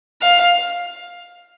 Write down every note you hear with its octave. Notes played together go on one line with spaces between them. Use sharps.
F5